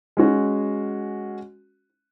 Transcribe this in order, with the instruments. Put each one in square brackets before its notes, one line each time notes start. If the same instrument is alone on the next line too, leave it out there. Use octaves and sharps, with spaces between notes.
[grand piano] G#3 C#4 F#4